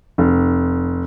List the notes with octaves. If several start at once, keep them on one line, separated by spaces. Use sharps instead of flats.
F1